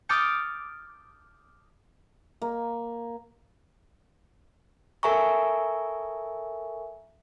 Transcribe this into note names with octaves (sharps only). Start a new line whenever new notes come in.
D6 D#6 F6 G6 A6 C#7
A#3
A4 A#4 E5 G#5 A#5 C#6